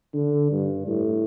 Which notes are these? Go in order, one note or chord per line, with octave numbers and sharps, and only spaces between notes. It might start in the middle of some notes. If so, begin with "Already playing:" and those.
D3
G2
A2